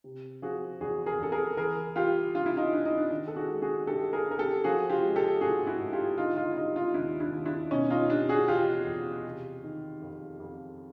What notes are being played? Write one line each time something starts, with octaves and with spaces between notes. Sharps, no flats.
C3
F3 F#4 G#4
E2 F#4 G#4
G#4 A#4
E2 A4
G#4 A#4
E3 G#4 A#4
G3 F4 G4
G2 F4
E4
D#4 F4
G2 D4
D#4
D4
D#3 D4
A4
F#4 G#4
G#3
F#4 G#4
G2 G4 A4
G#4 A#4
G2
A#4
G4 A4
F3 F#4 G#4
F4 G4
G#3
G4 A4
G#2 F#4 G#4
E4 F#4
G#2
F4 G4
D3 D#4 F4
D#4 F4
E4
G3 D#4 F4
D#4 F4
D#2 D4 E4
D4 E4
D#2
D4 E4
B2 C#4 D#4
D#4 F4
G3 D4
F#4 G#4
E2 F4 G4
E2
C3
D#3
F2
F2